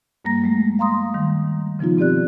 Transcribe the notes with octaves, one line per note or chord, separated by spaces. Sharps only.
G2 G3 A#3 A#5 A#6
F#3 G#3 A3
F5 A#5 C6 D#6
D#3 G3
C#3 F3 B3 D#4 F4
B2 C4 G4 D5 F#6